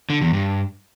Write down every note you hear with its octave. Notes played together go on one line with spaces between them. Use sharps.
D3
E2
G2